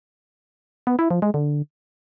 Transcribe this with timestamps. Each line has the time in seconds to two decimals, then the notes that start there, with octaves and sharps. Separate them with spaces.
0.87 B3
0.99 E4
1.11 F3
1.22 G#3
1.34 D3